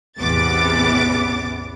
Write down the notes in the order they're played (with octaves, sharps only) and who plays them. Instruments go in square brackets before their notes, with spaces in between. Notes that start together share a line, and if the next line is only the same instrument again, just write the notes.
[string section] A1 E2 C3 B3 D6 A6